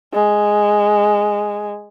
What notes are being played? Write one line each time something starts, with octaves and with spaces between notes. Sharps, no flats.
G#3